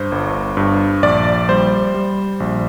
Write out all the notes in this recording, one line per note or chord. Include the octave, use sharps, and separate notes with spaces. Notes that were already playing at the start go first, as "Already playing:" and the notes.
Already playing: G2 C5
G1
G2
A#1 D5
G3 C5
G3
A#1